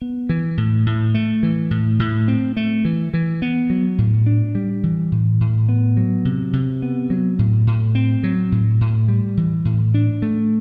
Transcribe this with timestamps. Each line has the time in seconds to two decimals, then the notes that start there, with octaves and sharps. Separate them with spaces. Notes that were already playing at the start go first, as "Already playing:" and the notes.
0.01 B3
0.29 E3
0.57 A2
0.86 A2
1.14 A3
1.43 E3
1.71 A2
1.99 A2
2.28 C4
2.57 A3
2.85 E3
3.14 E3
3.42 B3
3.70 F#3
3.98 A2
4.26 D4
4.55 G3
4.83 E3
5.12 A2
5.40 A2
5.69 B3
5.97 F#3
6.25 C3
6.53 C3
6.82 B3
7.10 F#3
7.39 A2
7.67 A2
7.95 C4
8.23 F#3
8.52 A2
8.81 A2
9.08 G3
9.37 E3
9.65 A2
9.94 D4
10.22 A3